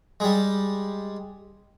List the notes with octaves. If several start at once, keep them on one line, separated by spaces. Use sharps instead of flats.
G3 G#3